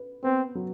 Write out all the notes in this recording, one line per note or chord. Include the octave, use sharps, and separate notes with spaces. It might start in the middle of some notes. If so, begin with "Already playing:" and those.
Already playing: B4
B3 C4
F#3